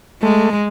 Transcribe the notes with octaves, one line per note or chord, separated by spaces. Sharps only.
G#3 A3